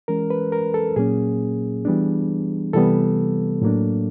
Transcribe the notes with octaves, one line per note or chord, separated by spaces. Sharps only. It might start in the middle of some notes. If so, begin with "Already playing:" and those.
E3 G#3 C#4 A#4
B4
A#4
A4
A#2 F#3 A#3 C#4 G#4
E3 G3 B3 D4
C3 E3 G3 B3 A4
A2 F#3 A#3 D4